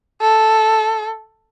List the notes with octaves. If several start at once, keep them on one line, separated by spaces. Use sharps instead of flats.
A4